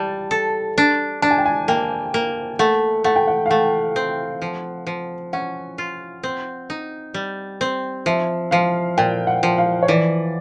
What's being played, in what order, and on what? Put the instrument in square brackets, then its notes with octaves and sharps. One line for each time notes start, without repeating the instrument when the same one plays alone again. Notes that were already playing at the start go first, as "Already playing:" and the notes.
Already playing: [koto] G3 [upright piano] A5
[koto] A4
D4
[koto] D4 [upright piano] A5
[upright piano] G#5
G5
G#5
[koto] A#3 [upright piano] G5
[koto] A#3
[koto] A3 [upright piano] F#5
[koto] A3 [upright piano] F#5
[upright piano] G5
F#5
F5
[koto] A3 [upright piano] F#5
[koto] C4
F3
F3
[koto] C#4 [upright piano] F#5
[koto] F4
C4
D#4
G3
C4
[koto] F3 [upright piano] E5
[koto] F3 [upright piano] F5
[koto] A#2 [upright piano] G5
[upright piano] F#5
[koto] F3
[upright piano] F5
C#5
[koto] E3 [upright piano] D5